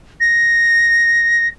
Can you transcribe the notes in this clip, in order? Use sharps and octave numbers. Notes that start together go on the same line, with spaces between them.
A#6